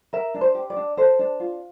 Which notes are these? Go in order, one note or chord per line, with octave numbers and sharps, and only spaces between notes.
A#4 E5
D4
C5
G4
D5
D4
A4 C5
D4
F4